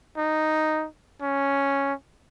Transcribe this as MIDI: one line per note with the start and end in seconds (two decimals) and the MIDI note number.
0.17 0.86 63
1.22 1.94 61